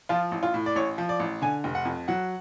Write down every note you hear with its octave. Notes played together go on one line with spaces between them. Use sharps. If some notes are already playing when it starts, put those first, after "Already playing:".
F3 F4
A1
F4
A2
D5
A1 C#5
F3
D5
A1
D3 G#5
F1
F#5
F2
F#3 F#5